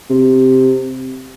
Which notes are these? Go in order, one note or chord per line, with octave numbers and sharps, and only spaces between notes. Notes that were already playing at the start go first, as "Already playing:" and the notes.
C3